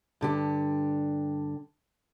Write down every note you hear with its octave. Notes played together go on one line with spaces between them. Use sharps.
G2 D3 G4